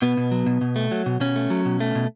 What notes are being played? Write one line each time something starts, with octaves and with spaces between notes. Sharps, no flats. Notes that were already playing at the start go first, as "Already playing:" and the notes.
B2 B3
B2
F#3
B2
B2
A3
F#3
B2
B2 C#4
A3
F#3
B2
A3
B2